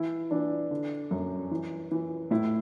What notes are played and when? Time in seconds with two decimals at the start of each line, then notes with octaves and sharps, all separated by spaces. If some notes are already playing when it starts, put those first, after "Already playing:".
Already playing: E3 E4
0.31 E3 D4
0.71 D3
1.11 F#2
1.51 E3
1.91 E3
2.31 A2 E4